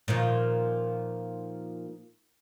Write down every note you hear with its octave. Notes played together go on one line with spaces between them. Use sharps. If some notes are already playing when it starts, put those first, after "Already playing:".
A#2 D#3 F3